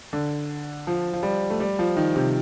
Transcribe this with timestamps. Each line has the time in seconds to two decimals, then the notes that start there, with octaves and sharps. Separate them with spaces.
0.13 D3
0.87 F3
1.13 F3
1.23 G3
1.50 A3
1.60 G3
1.79 F3
1.97 D#3
2.16 C3